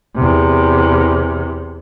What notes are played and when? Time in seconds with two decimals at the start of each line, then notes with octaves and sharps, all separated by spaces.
0.16 E2 C3